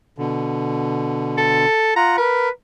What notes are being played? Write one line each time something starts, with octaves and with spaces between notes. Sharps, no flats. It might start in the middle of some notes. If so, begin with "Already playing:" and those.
B2 D3
A4
F4 F#5 A#5
A#4 B4